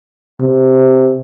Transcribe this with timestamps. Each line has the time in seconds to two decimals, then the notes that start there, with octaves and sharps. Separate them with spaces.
0.40 C3